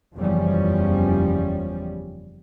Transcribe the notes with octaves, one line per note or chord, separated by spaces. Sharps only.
F#1 E2 F3 G3 C#4